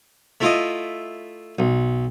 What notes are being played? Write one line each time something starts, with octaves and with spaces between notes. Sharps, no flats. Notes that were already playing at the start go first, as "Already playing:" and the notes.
A3 E4 F4 D#5
B1